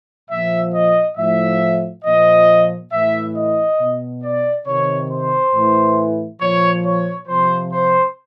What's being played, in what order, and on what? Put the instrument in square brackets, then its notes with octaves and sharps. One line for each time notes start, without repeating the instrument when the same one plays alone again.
[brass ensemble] A#2 F3 E5
D#5
A2 F3 E5
A#2 F3 D#5
A2 E3 E5
D#5
B2
D5
C3 D#3 C#5
C5
A2 E3
A#2 F3 C#5
C#5
C3 F3 C5
C5